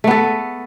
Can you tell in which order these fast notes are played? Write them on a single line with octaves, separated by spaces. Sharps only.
A3 B3 A4